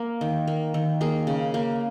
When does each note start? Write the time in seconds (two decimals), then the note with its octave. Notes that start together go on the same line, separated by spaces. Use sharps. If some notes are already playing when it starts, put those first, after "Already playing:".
Already playing: A#3
0.21 D#3
0.47 A#3
0.74 D#3
1.01 A#3 G#4
1.27 C#3
1.54 A#3